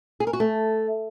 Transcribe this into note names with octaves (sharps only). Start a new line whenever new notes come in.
G#4
A#4
F#4
A3